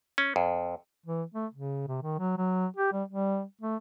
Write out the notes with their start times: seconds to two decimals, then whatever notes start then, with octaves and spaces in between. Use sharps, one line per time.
0.18 C#4
0.36 F2
1.06 E3
1.35 A3
1.54 C#3
1.88 C3
2.03 D#3
2.19 F#3
2.38 F#3
2.77 G4
2.93 G3
3.08 G3
3.62 A3